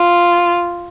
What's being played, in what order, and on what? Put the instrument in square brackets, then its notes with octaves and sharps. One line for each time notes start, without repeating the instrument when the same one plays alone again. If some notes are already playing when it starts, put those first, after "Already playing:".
Already playing: [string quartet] F4